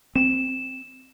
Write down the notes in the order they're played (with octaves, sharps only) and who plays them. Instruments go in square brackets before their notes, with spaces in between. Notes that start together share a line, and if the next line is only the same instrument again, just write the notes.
[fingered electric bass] C4 [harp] E7